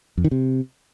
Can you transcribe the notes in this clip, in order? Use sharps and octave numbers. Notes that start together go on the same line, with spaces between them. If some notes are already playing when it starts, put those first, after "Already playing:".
F2
D#3
C3